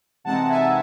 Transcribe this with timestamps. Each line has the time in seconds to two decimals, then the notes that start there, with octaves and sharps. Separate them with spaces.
0.24 C3 E3 G#3 C4 D#4 F#5 A5
0.49 E5 G#5